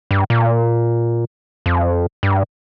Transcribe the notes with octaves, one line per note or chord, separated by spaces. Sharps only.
G2
A#2
F2
G2